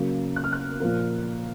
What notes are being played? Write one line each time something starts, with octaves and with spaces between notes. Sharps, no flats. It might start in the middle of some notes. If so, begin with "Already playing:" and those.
Already playing: C#3 F#3 A#3
F#6
F6
F#6
A#2 F3 A#3